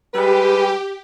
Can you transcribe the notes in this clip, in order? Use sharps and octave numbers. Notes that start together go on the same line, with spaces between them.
G3 G#3 G4 B4